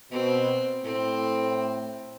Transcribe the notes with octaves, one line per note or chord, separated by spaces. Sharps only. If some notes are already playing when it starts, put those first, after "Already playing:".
B2 C4
A2 C4